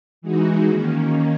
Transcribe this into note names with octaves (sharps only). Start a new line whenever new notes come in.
E3 G#3 D#4 F#4
D#3 A#3 C#4